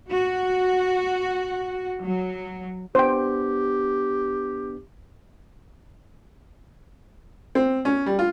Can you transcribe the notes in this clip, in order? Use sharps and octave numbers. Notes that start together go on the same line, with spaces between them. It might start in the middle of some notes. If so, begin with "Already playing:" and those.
F#4
F#3
B3 D4 G4 C5 G5
C4
C#4
G3
F4